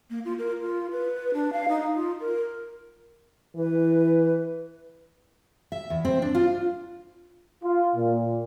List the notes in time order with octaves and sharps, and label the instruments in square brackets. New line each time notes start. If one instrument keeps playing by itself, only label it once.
[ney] A#3
F4
A#4
F4
B4
D4
F5
D#4
F4
A#4
[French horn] E3 [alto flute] B4
[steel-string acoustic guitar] E5
E2
C4
D4
F4
[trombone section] F4
A#2